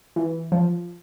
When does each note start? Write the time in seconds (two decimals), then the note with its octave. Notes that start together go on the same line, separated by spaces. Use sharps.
0.16 E3
0.52 F3